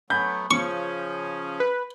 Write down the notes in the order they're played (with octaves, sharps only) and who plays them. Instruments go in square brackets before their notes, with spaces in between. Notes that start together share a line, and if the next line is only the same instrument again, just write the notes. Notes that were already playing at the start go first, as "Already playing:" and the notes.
[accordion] F#3 A3 B3 [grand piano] G#5 B5 G6
[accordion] C#3 F3 C#4 [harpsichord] C#6
[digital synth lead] B4